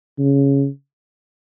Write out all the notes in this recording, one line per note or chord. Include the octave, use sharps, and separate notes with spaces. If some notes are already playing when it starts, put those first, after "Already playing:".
C#3